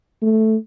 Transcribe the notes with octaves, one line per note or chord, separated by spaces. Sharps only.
A3